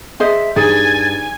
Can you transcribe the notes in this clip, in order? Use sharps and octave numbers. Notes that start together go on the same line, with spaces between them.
G#4 C5 D#5 E5
G2 D#4 G#4 G#5 A6